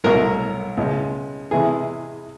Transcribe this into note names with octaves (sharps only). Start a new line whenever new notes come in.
C2 B2 F#3 A3 A#4
C#2 B2 G#3
E2 C3 E3 G#3 B3 G#4